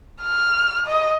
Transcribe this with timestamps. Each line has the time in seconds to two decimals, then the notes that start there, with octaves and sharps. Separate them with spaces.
0.22 F6
0.86 D#5